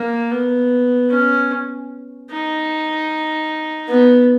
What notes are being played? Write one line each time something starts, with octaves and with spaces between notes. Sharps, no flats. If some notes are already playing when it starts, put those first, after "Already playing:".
Already playing: A#3
B3
C#4
D#4
B3